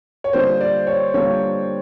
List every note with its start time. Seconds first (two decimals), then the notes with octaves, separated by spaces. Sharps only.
0.24 C#5
0.33 D3 G3 A#3 D4 F4 C5
0.61 D5
0.87 C#5
1.14 D3 G3 A#3 D4 F4 C#5